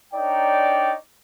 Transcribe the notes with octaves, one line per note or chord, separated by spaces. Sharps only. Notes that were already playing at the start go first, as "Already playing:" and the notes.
D4 D#4 A#4 C#5 D5 G5